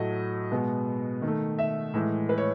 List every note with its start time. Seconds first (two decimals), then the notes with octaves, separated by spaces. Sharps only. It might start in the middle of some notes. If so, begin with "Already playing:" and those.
Already playing: A2 F#3 A3 D#5
0.52 B2 G#3 B3
1.22 D#3
1.28 A3
1.59 E5
1.94 A2 E3 G#3
2.29 B4
2.38 C#5